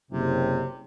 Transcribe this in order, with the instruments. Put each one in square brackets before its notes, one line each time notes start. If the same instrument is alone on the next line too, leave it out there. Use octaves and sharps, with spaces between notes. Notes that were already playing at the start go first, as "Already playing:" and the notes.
[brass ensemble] F#1 C4 [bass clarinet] C3